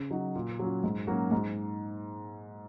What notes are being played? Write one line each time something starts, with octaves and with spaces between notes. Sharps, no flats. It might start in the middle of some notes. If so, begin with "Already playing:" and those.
Already playing: C#3
F#3 D#4 F#4
A#2
F#3 C#4 F#4
G#2
F#3 A#3 C#4 F#4
G#2